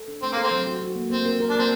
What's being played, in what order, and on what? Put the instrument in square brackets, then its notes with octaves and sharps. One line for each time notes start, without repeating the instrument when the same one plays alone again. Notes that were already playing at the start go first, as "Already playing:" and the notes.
Already playing: [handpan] A4
D4
[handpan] A3 [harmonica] C4
[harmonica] A#3 [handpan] A4
[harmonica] C4
[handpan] F#3
F#4
F#4
A#3
[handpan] A#3 [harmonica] C4
[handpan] A#4
A#4
[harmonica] D4
[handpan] A#3 [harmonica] C4